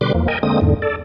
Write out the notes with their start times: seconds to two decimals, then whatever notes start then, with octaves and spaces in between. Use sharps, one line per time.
0.01 B2 D3 G3 B4 C6 D6
0.15 E2 F3 A#3
0.28 A#4 D#5 G5 G#5
0.43 D3 G#3 A#3 C4 D#6
0.61 E2 G#2 D3
0.82 A4 D5